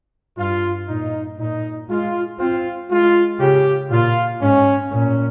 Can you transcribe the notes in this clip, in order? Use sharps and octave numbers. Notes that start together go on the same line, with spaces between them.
G2 F4
A#2 D#4
A#2 D#4
G#3 F4
C4 F4
G#3 F4
C#3 G4
A#2 F4
G#2 C#4
A#2 C#4